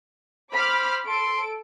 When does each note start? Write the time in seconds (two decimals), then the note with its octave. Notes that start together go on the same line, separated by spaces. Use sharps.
0.52 C5 B5 D6 F6
1.07 A4 C6 D7